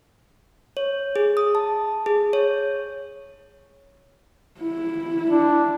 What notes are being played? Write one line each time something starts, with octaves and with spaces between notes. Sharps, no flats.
C#5
G#4
D#6
A5
G#4
C#5
E4
D4